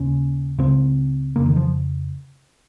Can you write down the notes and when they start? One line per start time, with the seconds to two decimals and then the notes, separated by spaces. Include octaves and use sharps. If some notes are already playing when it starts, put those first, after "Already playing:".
Already playing: D#2 C#3 C#4
0.58 C#2 C#3 C4
1.36 F2 C#3 A#3
1.46 D#3
1.56 F3